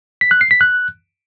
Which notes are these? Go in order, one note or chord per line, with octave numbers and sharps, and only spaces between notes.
B6
F#6
C7
B6
F#6